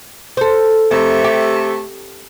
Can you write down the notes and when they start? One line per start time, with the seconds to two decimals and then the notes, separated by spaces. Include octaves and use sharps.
0.37 A4 C5
0.91 F2 C3 A3
1.24 G4